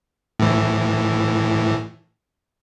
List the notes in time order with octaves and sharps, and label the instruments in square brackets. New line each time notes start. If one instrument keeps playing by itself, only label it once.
[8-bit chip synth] A2 E3